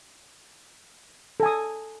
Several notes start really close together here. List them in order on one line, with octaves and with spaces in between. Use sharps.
A4 G#5 D#6